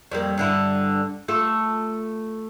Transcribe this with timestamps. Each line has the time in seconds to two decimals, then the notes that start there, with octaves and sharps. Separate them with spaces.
0.11 F2 G3 A#3
0.38 G2 D3 E4
1.28 A3 F4 A4